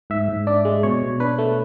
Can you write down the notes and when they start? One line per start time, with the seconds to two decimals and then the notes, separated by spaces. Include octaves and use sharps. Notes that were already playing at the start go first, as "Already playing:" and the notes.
0.10 G#2 E5
0.28 G#2
0.47 D4 D5
0.65 G#3
0.83 B2 C#5
1.02 B2
1.20 D4 B4
1.39 A3